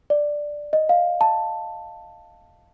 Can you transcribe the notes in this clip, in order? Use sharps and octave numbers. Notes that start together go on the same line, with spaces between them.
D5
D#5
F5
A5